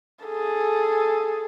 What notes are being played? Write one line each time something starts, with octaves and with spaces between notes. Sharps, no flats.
G#4 A4